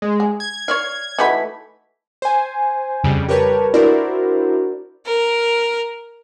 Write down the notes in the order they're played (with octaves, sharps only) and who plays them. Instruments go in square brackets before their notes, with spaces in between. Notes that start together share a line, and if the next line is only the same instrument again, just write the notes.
[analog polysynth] G#3
[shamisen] G#4
[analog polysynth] G#6
[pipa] C#5 D5 F5
[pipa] E3 A3 B5 [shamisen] D#4 F#4 B4
[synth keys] C5 G#5
F2 C#3 G3
G4 A#4 B4 C#5 A5
D4 E4 F#4 A#4 C5 D5
[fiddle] A#4